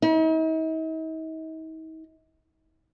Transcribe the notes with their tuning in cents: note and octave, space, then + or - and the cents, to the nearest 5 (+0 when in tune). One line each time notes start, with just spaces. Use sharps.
D#4 +45